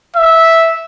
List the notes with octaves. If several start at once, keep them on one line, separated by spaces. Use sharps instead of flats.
E5